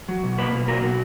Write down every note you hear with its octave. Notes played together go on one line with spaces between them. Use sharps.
F#3
B2
A#3 B4
B2
F#3 A#4
B2